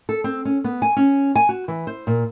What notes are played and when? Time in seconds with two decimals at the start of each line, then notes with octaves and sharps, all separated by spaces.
0.09 A4
0.24 C4
0.45 C#4
0.64 B3
0.82 G#5
0.97 C#4
1.35 G#5
1.49 F#4
1.68 E3
1.87 C5
2.07 A#2